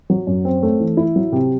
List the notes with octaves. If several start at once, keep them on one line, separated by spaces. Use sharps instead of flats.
F#3
F#2
C4
A3
E3
E4
F#3
C3